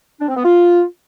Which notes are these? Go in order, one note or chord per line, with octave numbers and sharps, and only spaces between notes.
D4
C4
B3
F4